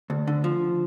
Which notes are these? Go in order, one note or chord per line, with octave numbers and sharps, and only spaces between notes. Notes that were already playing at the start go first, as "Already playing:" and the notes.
D2
D3
F3